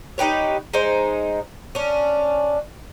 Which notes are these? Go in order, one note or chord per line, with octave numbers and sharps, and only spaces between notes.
D#4 G4 B4 C#5
G#3 D#4 C5
C#4 D4